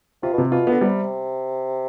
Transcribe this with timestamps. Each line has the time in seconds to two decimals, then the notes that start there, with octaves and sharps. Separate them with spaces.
0.23 C3 F4
0.33 B2
0.38 C3
0.51 B2 F4
0.67 D3 B3
0.81 C3 G3